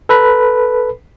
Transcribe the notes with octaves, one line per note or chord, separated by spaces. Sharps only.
A4 B4 B5